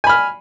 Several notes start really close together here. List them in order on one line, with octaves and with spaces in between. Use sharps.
G#5 B5 F6